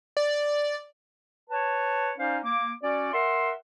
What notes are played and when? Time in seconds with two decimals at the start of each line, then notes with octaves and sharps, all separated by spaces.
0.17 D5
1.50 B4 C#5 A5
2.18 C#4 D#4 C5 D5 F5
2.44 A#3 D6
2.83 C#4 F#4 D5
3.13 A#4 E5 F#5 C6